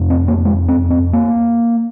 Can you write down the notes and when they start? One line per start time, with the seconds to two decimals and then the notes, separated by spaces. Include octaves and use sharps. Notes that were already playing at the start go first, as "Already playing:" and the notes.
Already playing: F2 C3
0.10 C4
0.28 A#3
0.45 G#3
0.68 C4
0.90 C4
1.13 A#3